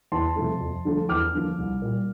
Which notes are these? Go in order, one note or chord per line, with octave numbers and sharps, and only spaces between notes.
E2 A5 C6
C3 F3 A3
F2
D3 F3 A3
E2 D6 F6
D3 F3 A#3
C2
A#2 G3